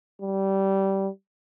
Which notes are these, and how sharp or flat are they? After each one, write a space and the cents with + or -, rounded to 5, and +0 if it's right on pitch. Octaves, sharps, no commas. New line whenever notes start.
G3 -15